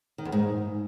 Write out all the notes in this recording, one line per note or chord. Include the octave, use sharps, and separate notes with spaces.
D#3
E2
G#2